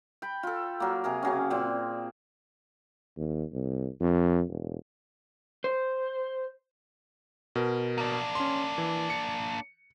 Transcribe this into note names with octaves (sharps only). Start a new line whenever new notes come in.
G5 B5
F4 A4
F#3 A#3
C3 G#4 A#4
C#3 F#3 C#4
A#2 C4
D#2
C2
F2
E1
C5
B2 A#4
A#3 D4
C#4 C6
E3
C#7